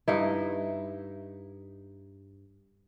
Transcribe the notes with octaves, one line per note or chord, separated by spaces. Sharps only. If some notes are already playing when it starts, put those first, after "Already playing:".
G2 D#4 E4